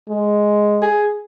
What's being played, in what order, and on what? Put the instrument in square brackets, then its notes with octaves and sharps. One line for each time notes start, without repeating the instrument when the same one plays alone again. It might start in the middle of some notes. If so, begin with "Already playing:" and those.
[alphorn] G#3
[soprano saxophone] G#4